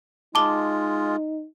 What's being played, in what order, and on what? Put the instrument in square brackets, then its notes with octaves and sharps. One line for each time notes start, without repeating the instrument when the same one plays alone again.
[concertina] G#3 F4 [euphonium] D#4 [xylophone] A5 D6 G7